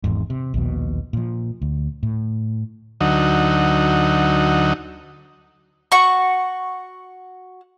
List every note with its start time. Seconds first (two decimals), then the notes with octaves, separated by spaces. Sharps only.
0.04 G#1 E2 G#2
0.30 C3
0.54 A#1 D#2 B2
1.13 A#2 F3
1.62 D2
2.03 A2
3.01 D2 F#3 D#4
5.92 F#4 C#6